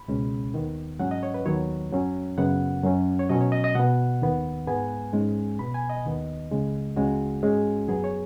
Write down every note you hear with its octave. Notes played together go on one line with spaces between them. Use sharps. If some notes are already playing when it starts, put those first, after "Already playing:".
Already playing: B5
C#2 B2 G#3 C#4
D#2 D#3 B3
G#2 F#3 C#4 F#5
D#5
C#5
B4
D#2 D#3 F#3 B3 C#5
F#2 F#3 C#4
F#2 C#3 B3 F#5
F#2 F#3 C#4
C#5
B2 F#3 C#4 D#5
C#5
D#5
D#5
B2 B3 F#5
D#2 D#3 B3
G#2 G#3 B3 G#5
G#2 G#3 C#4
B2 B3 B5
G#5
D#5
D#2 D#3 B3
C#2 C#3 G#3
C#2 C#3 G#3 F#4
G#2 G#3 C#4
F#2 F#3 B3 G#4
C#5